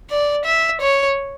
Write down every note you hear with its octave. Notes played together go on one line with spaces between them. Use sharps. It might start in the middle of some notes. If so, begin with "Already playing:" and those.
D5
E5
C#5